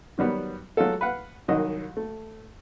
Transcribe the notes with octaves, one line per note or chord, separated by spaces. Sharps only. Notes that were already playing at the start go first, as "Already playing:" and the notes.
D#3 F#3 G3 B3
F#3 G#3 A3 F4 A4
B4 F5 F#5
C2 D#3 F#3 D#5
A3